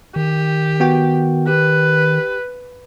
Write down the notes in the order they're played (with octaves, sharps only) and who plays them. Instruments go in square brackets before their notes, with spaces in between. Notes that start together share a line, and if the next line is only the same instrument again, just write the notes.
[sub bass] D#3 [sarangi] G4
[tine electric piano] B3 F#4 G5
[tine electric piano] G4 [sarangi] B4